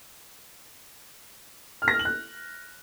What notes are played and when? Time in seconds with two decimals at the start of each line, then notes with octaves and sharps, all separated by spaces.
1.82 F6
1.88 A#6
1.94 F6
1.99 F#7
2.05 F#6